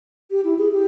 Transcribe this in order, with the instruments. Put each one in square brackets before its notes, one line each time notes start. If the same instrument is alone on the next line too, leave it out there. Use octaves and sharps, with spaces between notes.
[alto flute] G4
E4
G#4
G4